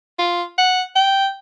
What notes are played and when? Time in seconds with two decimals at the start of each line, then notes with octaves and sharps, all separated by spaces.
0.19 F4
0.58 F#5
0.96 G5